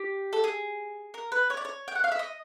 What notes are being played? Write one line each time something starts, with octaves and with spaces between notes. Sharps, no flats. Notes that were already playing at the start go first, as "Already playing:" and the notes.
Already playing: G4
A4
G#4
A#4
B4
C#5
D5
C#5
G5
F#5
F5
E5
D#5